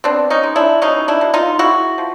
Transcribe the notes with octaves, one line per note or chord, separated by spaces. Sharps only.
B3 C4 D4
C#4 D#4
G#3
D4 E4
B2 C#4 D#4
D4 E4
B2
D#4 F4
G#3 E4 F#4
F3